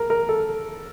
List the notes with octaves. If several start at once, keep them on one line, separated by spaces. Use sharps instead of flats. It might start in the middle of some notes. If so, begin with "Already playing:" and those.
Already playing: A#4
A#4
A4